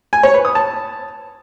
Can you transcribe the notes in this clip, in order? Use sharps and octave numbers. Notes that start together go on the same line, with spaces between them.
G#5
C#5
B4
D#6
A5